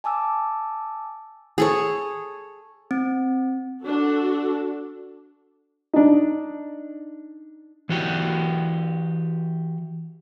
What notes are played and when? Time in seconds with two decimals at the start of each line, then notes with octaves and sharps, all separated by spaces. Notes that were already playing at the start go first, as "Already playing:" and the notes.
0.04 G#5 A5 D6 E6
1.58 G#4 A4 C#5
2.91 C4
3.85 D4 F#4 A4
5.93 D4 D#4
7.89 E3 F#4 G4 G5